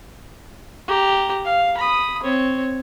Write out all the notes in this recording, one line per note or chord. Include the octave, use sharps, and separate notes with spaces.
G4 A#5
F5
B5 D#6
C4 C#5